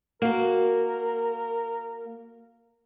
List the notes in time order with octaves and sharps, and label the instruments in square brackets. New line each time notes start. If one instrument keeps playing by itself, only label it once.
[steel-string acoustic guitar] A#3 F#4 [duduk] A#4